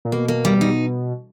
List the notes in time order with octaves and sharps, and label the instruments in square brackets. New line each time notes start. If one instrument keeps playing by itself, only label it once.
[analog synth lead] A#2
[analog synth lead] B2 [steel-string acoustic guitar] A#3
[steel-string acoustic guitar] A#3
G3
D#4